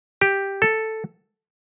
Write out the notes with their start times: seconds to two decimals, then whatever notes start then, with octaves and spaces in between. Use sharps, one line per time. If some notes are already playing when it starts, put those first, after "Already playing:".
0.21 G4
0.62 A4